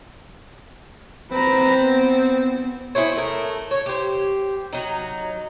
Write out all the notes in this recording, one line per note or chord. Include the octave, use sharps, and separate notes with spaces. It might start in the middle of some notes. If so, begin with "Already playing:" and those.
C4 B4 A#5
B3
E4 G#4 C5 C#5
A3 A#4
C#5
G4 C5
F#3 D#4